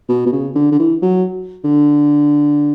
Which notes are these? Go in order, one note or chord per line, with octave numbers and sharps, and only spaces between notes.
B2
B2
C#3
D3
D3
E3
F#3
D3